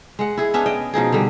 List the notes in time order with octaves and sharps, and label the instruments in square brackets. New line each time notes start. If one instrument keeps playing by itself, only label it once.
[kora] G#3 F#5
E4 G#4
B3 C#4 D4 E5
D#5 G5
B2 F3 D#4 G#4
D3 G3